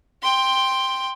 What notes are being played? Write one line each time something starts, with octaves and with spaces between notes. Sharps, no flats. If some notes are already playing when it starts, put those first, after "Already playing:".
G5 C6